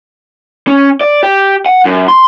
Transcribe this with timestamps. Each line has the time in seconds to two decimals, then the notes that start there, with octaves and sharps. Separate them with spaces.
0.67 C#4
1.01 D5
1.23 G4
1.66 F#5
1.85 F#2
2.08 C6